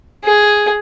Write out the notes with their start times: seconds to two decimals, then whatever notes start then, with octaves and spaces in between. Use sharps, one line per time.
0.24 G#4